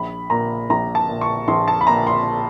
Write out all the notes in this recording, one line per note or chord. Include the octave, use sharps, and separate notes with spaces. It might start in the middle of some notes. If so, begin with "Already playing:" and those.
Already playing: A#1 B5
A#2 A#5
A#1 A#5
A5
A#2
C#6
A#1 C6
A5
B5
A#2 A#5
C6